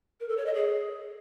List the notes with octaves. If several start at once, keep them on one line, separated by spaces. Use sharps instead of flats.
A#4
A4
C#5
D#5
G#4